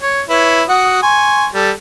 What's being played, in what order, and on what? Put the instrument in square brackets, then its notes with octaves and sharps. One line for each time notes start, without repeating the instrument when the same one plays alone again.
[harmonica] C#5
E4 B4 C#5
F#4 F#5 D#6
G#5 C6 C#6
G3 A4